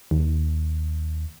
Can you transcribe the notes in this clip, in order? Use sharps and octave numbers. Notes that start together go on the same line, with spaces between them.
D#2